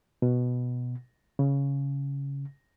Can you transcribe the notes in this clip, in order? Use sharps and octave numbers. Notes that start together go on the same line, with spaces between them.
B2
C#3